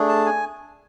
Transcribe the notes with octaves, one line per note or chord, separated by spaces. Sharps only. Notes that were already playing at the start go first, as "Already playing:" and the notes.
Already playing: A3 D4 G#4
A5
G#5